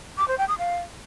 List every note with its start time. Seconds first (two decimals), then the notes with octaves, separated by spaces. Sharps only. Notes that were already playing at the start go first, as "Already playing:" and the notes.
0.18 D6
0.28 C5
0.38 G5
0.48 D#6
0.58 F5